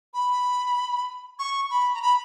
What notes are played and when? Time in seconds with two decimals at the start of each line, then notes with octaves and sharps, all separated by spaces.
0.14 B5
1.39 C#6
1.70 B5
1.94 A#5
2.02 B5